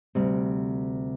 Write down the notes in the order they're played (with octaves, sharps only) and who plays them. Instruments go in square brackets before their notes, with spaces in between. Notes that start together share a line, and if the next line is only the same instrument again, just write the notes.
[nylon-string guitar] D2 C3 G3